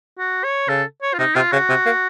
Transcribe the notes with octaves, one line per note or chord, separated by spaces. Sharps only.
F#4
C#5
C#3 A4
C#5
F4
C3 D#4
C3 F4
C#3 F#4
C3
A#3